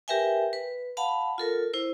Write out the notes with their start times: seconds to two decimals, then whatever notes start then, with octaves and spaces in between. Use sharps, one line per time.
0.08 G4 A#4 B4 E5 G5 G#5
0.53 B4
0.97 F5 F#5 A5 B5
1.38 F4 A4 A#4
1.74 E4 C5